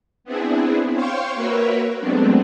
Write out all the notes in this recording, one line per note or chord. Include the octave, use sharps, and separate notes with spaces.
B3 C4 D4 E4 G#4
C5 C#5 F5 G5 C6 C#6
A#3 F#4 A#4 B4 C#5 E5
F#3 G#3 A3 B3 C4 D4